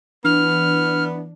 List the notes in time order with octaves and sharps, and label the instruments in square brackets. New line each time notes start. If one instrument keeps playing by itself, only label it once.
[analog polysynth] E3 D4 [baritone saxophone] B3 [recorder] F6